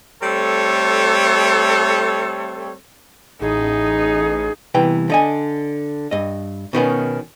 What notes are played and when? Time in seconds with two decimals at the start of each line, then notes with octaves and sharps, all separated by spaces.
0.23 G3 A3 C4 A4 C#5
3.42 A1 D#4 G#4
4.75 C2 E3 B3 G5
5.10 D3 D#5 G#5
6.11 G2 D#5
6.73 B2 D#3 B3 C#4